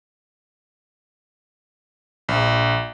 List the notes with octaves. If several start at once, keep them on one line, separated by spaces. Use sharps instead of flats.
A#1